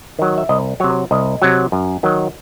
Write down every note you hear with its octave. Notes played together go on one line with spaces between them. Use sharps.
D#3 F#3
E5
C2 D#5
C3 F#3 C#5
C2 D#5
C3 F#3
F#2
D#3 F#3